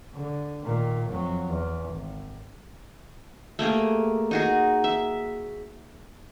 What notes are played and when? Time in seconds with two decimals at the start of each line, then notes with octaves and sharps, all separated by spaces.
0.14 D3
0.63 A#2 D#3
1.09 F2 F#3
1.48 E2
1.88 G#1
3.59 A3 A#3 G4 G#4
4.31 D#4 F#4 G#4
4.84 E5